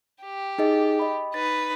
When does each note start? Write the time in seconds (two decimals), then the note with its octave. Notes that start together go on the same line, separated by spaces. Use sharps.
0.23 G4
0.58 D#4 G#4 D#5
0.99 D#5 B5
1.34 D#4 B4 A6